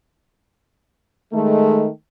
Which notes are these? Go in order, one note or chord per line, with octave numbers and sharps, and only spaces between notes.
D#3 G#3 A3